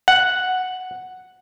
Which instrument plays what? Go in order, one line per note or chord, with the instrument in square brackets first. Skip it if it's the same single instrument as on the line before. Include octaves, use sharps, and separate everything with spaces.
[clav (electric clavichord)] F#5